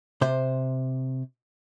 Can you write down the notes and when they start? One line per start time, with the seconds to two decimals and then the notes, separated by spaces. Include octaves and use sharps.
0.21 C3 C5